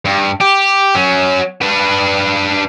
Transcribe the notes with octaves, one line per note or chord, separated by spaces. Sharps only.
G2
G4
F#3 C#4
D4 B4